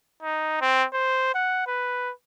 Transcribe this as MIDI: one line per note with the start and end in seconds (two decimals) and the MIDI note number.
0.23 0.57 63
0.61 0.85 60
0.93 1.34 72
1.35 1.64 78
1.67 2.11 71